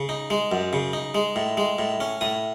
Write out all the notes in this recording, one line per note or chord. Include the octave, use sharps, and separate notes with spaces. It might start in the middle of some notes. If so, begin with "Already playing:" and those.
Already playing: C#3
D#4
G#3
F#2
C#3
D#4
G#3
A2
G#3
A2
C#4
A2 D#6